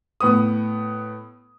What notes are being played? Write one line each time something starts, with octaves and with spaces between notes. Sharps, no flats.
A2 B3 D#6